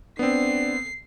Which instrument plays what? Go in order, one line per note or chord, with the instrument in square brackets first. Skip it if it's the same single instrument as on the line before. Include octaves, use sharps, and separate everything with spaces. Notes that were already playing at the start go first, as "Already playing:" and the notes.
[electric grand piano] B3 C4 [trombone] D4 [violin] C7